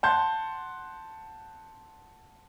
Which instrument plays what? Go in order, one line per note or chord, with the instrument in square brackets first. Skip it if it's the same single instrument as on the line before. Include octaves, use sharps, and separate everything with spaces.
[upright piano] F#5 A5 C6 G6